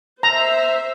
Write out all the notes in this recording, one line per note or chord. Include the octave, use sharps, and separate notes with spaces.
C5 E5 A#5